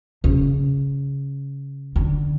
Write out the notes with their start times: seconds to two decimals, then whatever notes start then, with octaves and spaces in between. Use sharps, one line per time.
0.24 C#3
1.96 D3